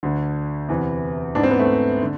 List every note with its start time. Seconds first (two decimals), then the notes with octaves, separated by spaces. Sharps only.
0.03 D2 D3
0.69 E2 C3 E3
1.35 G#2 E3 D4
1.43 C4
1.51 B3
1.59 A3
2.03 D3